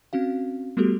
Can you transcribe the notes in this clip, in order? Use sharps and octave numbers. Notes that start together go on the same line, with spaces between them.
C4 C#4 F#4 F5
G3 A3 B3 F#4 G4 A4